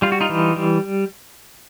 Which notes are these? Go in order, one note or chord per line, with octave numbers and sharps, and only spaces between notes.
G3 F4
F#4
D#4 F4
E3
G3